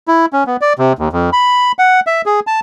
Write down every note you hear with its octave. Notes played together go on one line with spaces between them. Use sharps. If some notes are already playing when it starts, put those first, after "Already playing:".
E4
C#4
B3
D5
C3
D#2
F2
B5
F#5
E5
G#4
A5